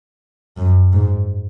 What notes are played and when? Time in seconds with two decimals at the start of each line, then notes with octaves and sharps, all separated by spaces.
0.57 F#2
0.93 G#2